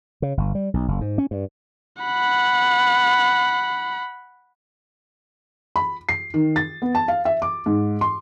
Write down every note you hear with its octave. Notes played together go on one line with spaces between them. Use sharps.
C#3
G1
G3
B1
F#1
G#2
C#4
G2
F#5 B5
B5
C7
D#3
A6
B3
A5
F5
E5
D6
G#2
C6